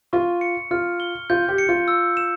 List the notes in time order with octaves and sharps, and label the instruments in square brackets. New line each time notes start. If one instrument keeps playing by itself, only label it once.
[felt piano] F4 [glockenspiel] C#6
[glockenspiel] C#7
[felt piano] F4 [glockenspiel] F6
[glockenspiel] G7
[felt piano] F4 [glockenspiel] G6
[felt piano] G4
[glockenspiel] C#7
[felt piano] F4
[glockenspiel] E6
E7